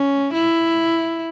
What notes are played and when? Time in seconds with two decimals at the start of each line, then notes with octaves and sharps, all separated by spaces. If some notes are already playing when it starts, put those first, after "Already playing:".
Already playing: C#4
0.33 E4